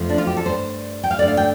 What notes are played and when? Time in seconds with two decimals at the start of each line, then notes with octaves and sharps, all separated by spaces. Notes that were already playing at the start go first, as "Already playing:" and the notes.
Already playing: F2 F3 A3
0.09 D4
0.18 F4
0.27 G4
0.37 A4
0.46 G2 G3 C5
1.04 G5
1.11 F5
1.19 G2 D3 A3 D5
1.28 F5
1.37 G5